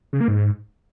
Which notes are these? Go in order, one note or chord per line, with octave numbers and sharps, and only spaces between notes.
C#3
A#3
G#2